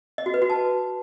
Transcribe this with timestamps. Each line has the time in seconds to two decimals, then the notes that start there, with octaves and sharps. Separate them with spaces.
0.18 D#5
0.26 F#4
0.34 B4
0.42 F#4
0.50 A5